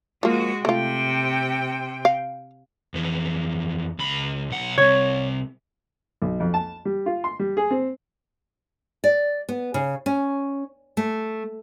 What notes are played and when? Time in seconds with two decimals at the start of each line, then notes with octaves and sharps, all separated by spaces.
0.23 F3 G#3 A#3 F#4
0.65 C3 A3 F4 G5
2.05 F5
2.94 F2 E3
3.99 C#2 B5
4.50 B1 F#5
4.78 C2 C3 C#5
6.22 B1
6.40 F2
6.54 A5
6.85 G3
7.06 F4
7.24 C6
7.39 G3
7.57 G#4
7.71 C4
9.04 D5
9.49 B3
9.74 C#3
10.06 C#4
10.97 A3